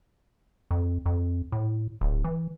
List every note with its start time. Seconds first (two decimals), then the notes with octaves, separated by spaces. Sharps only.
0.71 F2
1.06 F2
1.52 A2
2.01 D1
2.24 E3